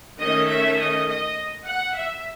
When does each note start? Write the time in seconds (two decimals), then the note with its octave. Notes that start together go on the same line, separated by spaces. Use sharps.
0.19 D#3 A3 C#4 D#5
0.48 E5
0.78 D#5
1.07 D#5
1.66 F#5
1.96 E5